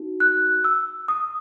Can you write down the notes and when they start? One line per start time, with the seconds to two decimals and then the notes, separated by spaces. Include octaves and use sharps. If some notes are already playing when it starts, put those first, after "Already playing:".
Already playing: D#4 F#4
0.20 F#6
0.64 E6
1.08 D#6